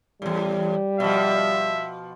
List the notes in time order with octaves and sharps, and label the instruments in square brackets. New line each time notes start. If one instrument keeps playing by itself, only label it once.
[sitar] E2 A2 [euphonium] G3
[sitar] B2 F3 [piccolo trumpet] E5